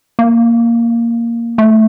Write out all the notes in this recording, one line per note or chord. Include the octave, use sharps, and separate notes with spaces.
A#3
A3